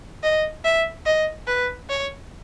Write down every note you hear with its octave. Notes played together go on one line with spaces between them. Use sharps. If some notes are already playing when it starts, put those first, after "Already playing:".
D#5
E5
D#5
B4
C#5